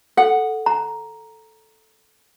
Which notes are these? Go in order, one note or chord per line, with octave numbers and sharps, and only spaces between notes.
A4 F#5
A#5